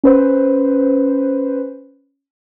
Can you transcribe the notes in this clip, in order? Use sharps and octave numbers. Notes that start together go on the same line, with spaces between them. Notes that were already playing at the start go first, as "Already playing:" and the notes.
C#4 B4 C5